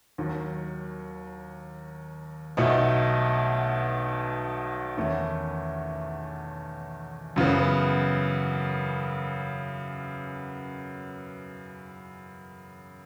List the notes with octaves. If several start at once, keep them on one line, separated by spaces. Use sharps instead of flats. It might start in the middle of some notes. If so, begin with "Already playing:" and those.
D#2 D#3 F#3
B1 B2 A3 D#4
E2 D#3 A3 C#4 E4
F#2 C#3 E3 B3